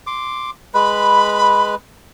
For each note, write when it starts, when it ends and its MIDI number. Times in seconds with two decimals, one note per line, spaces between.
0.07 0.50 84
0.07 0.50 86
0.74 1.75 56
0.74 1.75 71
0.74 1.74 83